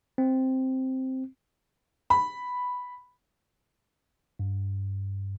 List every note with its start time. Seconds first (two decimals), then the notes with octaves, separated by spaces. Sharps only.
0.18 C4
2.10 B5
4.39 G2